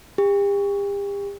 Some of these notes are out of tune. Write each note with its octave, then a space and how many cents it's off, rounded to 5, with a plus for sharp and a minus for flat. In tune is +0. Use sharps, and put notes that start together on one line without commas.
G4 +40